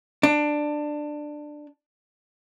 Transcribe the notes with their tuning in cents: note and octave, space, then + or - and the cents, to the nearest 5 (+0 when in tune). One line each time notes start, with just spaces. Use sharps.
D4 +15